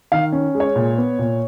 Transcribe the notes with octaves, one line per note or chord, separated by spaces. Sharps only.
D#3 F5
C#4
G#3
C#5
A#2
B3
A#2